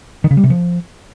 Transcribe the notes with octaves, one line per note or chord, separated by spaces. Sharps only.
D#3
C#3
G3
C3
F3